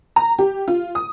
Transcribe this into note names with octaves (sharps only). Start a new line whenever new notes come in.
A#5
G4
F4
D#6